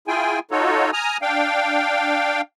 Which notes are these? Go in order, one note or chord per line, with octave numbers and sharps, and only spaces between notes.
E4 F4 G#4 G5 G#5
D#4 F4 F#4 A4 C#5
G#5 A#5 D#6 F6
D4 F5 G5